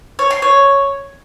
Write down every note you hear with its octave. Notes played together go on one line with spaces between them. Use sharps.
C#5
C6
C#5